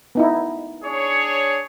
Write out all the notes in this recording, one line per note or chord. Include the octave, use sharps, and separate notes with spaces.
B3 D#4 E4
D4 G#4 C#5